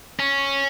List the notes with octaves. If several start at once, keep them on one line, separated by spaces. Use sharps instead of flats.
C#4